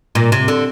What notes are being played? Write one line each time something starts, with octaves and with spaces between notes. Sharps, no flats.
A#2
C3
D3